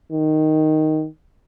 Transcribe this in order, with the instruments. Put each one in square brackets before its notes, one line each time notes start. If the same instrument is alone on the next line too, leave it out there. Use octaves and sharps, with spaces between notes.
[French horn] D#3